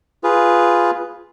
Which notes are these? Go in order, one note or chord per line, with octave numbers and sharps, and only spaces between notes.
F4 G#4 B4